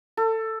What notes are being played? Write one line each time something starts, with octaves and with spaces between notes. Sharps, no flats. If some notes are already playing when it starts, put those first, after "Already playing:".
A4